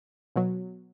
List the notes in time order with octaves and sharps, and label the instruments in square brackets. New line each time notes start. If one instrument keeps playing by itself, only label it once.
[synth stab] B2 F#3